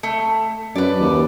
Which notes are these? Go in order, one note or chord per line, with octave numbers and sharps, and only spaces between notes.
A3
F#2 B4 D5
D#2